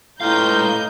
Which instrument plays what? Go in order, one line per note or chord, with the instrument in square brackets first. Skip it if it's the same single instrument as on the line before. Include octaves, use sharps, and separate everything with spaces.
[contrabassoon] A2 [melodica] F4 G4 [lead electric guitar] B4 F5 [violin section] D#5 A#5 G6